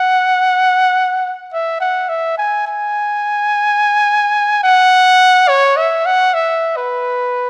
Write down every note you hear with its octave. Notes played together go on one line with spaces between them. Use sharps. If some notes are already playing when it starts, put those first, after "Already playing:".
Already playing: F#5
E5
F#5
E5
G#5
G#5
F#5
C#5
E5
F#5
E5
B4